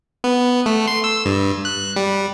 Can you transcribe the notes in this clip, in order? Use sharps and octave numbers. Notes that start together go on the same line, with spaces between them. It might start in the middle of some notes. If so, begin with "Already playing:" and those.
B3
A3
C6
E6
G2
F#6
G3